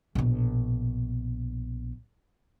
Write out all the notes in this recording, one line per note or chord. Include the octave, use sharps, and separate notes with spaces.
A#1 B2